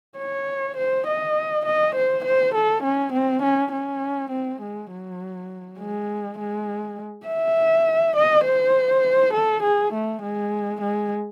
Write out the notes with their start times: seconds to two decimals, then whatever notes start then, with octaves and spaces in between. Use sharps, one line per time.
0.18 C#5
0.77 C5
1.07 D#5
1.66 D#5
1.96 C5
2.25 C5
2.55 A4
2.84 C#4
3.13 C4
3.43 C#4
3.73 C#4
4.31 C4
4.61 G#3
4.91 F#3
5.79 G#3
6.38 G#3
7.27 E5
8.16 D#5
8.44 C5
9.33 A4
9.63 G#4
9.93 A3
10.22 G#3
10.81 G#3